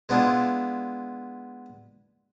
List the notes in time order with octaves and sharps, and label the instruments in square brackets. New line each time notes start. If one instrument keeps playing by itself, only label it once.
[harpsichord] G#3 B3 D4 E4 F4